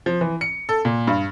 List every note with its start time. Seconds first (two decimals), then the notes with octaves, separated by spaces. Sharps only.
0.06 F3
0.21 E3
0.41 C#7
0.69 A4
0.85 A#2
1.07 G2